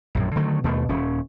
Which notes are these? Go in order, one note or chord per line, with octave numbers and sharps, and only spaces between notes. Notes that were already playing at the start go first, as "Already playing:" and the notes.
A#1 F#2 A2
D3 D#3 F#3 A3
D#2 B2 A3
D#1 C#4